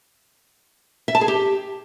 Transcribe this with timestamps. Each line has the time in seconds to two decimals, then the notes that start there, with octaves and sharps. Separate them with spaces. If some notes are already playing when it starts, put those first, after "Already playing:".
1.08 E5
1.15 A5
1.21 G#4
1.28 G4